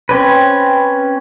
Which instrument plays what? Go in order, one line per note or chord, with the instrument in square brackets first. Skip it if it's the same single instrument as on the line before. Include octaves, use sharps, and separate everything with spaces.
[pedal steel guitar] C4 C#4 B4